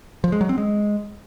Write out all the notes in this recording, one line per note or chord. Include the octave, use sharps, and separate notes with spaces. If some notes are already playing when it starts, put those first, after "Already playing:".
F3
G#3
F#3
C4
G#3